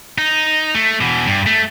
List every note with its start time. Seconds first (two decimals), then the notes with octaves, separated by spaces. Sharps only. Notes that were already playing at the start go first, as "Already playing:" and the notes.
0.18 D#4
0.75 A3
1.01 B2 E3
1.27 G2
1.47 A3